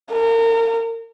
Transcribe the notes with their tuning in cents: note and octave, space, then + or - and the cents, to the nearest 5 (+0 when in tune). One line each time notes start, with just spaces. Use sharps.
A#4 -35